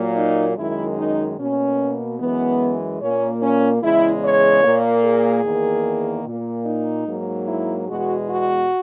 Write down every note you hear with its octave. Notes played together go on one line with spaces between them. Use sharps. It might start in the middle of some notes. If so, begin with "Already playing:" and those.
Already playing: A#2 F#3 A#3
D#4
F#2 D#3 G#3 E4
D#4
B2 A#3 C#4
F#2 E3 G#3 B3
A#2 A#3 C#4
C#4
E2 C#3 G#3 E4
C#5
A#2 A#3
G#4
E2 D#3 A#3
A#2 A#3
D#4
G#2 F#3 A#3
E4
E2 B2 G#3 F#4
F#4